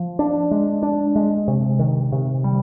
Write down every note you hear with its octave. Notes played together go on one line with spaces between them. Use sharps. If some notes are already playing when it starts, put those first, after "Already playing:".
Already playing: F3
D4
G#3
D4
G#3
C3
D#3
C3
G3